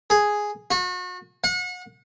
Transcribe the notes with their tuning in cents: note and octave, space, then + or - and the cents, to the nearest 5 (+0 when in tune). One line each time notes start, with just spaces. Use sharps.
G#4 +0
F#4 -35
F#5 -35